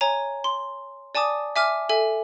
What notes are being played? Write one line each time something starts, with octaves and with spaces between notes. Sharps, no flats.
C#5 G#5 A#5
C6
D5 G#5 A5 D6 D#6
E5 G#5 D6 F6
A4 E5 G#5